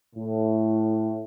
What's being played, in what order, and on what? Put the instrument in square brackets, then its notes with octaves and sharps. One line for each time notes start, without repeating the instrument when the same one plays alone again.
[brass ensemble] A2